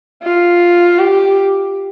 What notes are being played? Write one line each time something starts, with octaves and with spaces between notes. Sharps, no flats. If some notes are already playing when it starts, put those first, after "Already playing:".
F4
G4